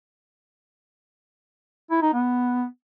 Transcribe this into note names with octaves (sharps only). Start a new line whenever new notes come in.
E4
D#4
B3